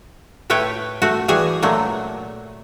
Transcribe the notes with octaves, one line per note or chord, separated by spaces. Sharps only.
A2 A3 B4 C#5 G5
A3 F#4
E3 G3 F#4 G#4 G#5
A#2 F#3 A3